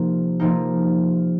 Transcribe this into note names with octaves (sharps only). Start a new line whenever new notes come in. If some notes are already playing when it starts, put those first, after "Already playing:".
Already playing: C3 F3 A#3 D#4
C3 F3 A#3 D#4